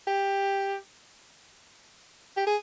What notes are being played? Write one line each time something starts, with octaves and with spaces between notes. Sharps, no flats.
G4
G4
G#4